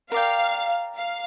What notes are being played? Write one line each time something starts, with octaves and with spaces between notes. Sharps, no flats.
A#4 D5 F5 G5
F5